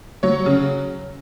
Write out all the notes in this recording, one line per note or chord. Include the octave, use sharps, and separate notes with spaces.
F#3 C#5
C#3